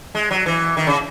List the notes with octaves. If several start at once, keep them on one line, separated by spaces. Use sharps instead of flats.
G#3
F#3
E3
D#3
C#3